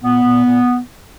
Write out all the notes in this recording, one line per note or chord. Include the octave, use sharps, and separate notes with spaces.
A#2 B3
A#2
A#2